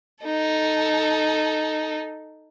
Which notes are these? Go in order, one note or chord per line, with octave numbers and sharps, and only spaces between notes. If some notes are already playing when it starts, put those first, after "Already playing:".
D#4 A4